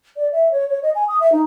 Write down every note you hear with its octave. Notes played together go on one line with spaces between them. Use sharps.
D5
E5
C#5
C#5
D#5
G#5
D#6
E5
D#4